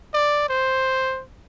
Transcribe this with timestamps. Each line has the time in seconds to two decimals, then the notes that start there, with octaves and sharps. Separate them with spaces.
0.14 D5
0.49 C5